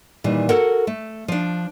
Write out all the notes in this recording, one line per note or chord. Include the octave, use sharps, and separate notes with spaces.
A#2 D#3 E3 G3
F#4 A4 A#4 F#5
A3
F3 D4